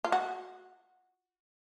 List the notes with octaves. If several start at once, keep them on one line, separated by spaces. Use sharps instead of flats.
F4
F#4